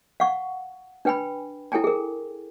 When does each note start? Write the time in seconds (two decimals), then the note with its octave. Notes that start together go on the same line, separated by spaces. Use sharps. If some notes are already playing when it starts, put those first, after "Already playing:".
0.20 F5 F#5 C#6
1.05 D4 B4 G5 G#5 B5
1.72 E4 A4 G5 G#5 A#5
1.84 G#4 A#4